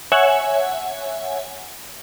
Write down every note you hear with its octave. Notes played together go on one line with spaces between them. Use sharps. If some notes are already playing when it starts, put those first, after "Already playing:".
C#5 E5 F#5 G#5